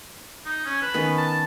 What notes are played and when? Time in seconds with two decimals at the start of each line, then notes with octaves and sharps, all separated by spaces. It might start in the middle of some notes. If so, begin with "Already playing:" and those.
0.46 D#4
0.66 C#4
0.82 B4 A5
0.94 D#3 B3 C#4
1.17 A5